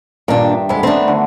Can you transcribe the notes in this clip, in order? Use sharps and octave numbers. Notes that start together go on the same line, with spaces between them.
G2 A#2 D#3 D4 G4
E5 G5
F2 G#3 F#5 G#5 B5
D#3 A3 B3 C4 D4
D3 F#4 B5